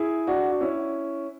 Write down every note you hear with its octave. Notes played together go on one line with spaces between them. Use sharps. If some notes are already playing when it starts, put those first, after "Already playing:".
Already playing: E4 G#4
D4 F#4
F#4
C#4 E4